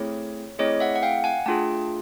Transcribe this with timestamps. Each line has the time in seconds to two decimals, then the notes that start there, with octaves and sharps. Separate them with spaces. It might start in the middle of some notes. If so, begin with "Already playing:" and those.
Already playing: A3 C4 E4 G#4 C#5
0.59 A3 C4 E4 G#4 C#5 D#5
0.80 E5 F#5
0.96 F#5
1.03 F5 G5
1.24 F#5 G#5
1.46 A3 D4 F4 G#4 G5 A5